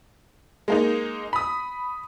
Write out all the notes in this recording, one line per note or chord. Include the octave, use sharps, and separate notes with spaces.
G#3 A#3 D#4
B5 D#6